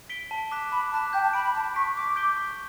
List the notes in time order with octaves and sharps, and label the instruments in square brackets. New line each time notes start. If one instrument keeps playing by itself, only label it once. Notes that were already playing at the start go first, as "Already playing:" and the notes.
[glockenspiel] B6 D7 G7
A5
D6 F#6 B6 E7
[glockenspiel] A5 [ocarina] B5
[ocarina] A5 [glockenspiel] D6 F#6 B6 E7
[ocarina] G5 [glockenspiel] G6
[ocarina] A5
[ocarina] B5 [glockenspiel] B6 D7
[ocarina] B5
[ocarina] A5 [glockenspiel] G6
[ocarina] C#6 [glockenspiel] B6 D7
[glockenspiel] C#6 [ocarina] D6
[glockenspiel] G6 B6 D7 G7
C#6